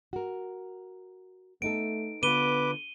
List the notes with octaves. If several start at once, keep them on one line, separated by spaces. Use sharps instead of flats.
F#4 A#4
A3 B3 D#4 A4 D7
D3 B3 F4 B4 D6 D#7 G7